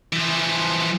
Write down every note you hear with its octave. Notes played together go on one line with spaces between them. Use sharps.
E3 F3